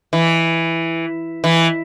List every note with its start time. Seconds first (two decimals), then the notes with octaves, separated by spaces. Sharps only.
0.13 E3
1.44 E3